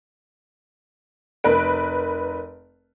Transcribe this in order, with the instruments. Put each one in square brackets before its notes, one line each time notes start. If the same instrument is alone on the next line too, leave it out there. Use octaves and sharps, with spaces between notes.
[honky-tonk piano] F1 A#4 B4 D7